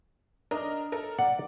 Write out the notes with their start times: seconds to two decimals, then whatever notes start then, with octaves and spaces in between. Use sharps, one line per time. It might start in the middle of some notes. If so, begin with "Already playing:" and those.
0.51 D4 A#4 D#5
0.92 A4 A#4
1.19 D5 F#5